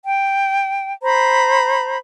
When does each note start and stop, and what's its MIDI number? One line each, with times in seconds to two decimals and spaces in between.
0.05 0.92 79
1.03 1.98 72
1.03 1.98 82
1.03 1.98 83